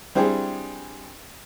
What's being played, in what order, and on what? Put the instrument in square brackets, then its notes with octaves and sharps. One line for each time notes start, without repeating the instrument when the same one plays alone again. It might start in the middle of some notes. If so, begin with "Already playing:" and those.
[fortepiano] G3 C4 D4 E4 G4 G#4